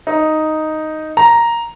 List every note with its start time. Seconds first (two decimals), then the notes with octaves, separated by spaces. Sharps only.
0.07 D#4
1.17 A#5